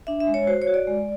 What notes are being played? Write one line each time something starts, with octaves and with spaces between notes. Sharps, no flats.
D4 E5
E5
G#3
C#5
F#4 C5
C#5
F#4
D5
G#3